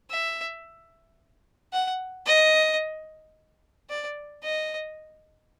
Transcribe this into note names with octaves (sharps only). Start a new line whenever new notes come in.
E5
F#5
D#5
D5
D#5